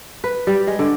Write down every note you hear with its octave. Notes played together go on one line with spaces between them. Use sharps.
B4
G3
G#3
D3